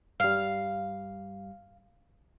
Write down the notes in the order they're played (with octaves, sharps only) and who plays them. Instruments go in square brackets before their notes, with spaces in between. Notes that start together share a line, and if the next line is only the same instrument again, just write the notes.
[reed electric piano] G2 G3 [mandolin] F5